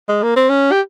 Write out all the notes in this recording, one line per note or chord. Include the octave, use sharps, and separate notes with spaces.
G#3
A#3
C4
C#4
G4